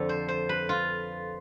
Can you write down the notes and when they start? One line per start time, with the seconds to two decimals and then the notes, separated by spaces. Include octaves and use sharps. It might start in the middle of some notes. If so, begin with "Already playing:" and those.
Already playing: F2 D3 F3 A4
0.09 C5
0.28 C5
0.49 B4
0.69 F4